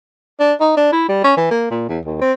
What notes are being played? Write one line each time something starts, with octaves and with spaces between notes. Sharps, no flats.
D4
D#4
D4
E4
G3
C#4
E3
A#3
A#2
E2
D#2
C4